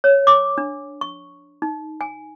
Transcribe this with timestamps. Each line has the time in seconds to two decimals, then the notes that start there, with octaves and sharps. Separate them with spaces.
0.04 C#5
0.27 D6
0.58 D4
1.01 C#6
1.62 D#4
2.01 G#5